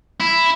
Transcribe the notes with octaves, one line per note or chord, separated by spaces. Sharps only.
E4